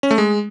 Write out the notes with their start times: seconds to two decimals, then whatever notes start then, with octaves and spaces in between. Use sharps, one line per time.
0.03 C#4
0.11 A3
0.18 G#3